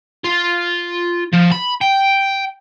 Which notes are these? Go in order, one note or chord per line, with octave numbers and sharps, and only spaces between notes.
F4
F3
B5
G5